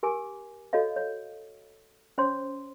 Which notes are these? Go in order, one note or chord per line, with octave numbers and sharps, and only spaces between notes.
G4 A#4 G#5 D6
F#4 A4 C#5 D#5 F5
C#5
C#4 C5 C#5 C6